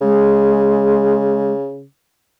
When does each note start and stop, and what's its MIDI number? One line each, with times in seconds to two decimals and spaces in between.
0.02 1.84 49
0.02 1.53 56